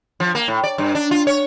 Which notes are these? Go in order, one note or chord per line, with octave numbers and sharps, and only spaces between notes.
F3
A#3
A2
D5
G2
D4
F4
C#5